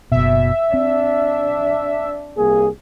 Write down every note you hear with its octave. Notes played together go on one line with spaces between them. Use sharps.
F#1 B2 E5
C4 D4
C2 A#3 G#4